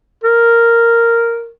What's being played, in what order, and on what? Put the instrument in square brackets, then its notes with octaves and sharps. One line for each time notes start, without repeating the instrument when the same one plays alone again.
[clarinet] A#4